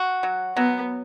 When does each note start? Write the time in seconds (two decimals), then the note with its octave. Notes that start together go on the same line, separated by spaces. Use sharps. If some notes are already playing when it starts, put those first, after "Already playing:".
Already playing: F#4
0.23 F#3
0.57 F#3 B3